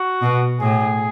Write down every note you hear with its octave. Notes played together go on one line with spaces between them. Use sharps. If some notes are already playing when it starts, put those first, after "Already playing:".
Already playing: F#4
B2
A2 G#4